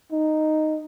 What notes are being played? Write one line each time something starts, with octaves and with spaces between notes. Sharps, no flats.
D#4